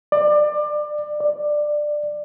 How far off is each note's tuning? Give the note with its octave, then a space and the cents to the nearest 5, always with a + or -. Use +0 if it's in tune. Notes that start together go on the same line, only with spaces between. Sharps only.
D5 +25
D5 +15